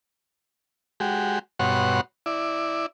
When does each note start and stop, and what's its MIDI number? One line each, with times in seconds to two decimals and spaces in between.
1.00 1.39 56
1.00 1.39 66
1.00 1.39 67
1.59 2.01 43
1.59 2.01 47
1.59 2.01 66
1.59 2.01 73
1.59 2.01 78
1.59 2.01 84
2.26 2.86 64
2.26 2.86 74